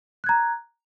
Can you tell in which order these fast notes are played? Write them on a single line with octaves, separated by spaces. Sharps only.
F#6 G#6 A#5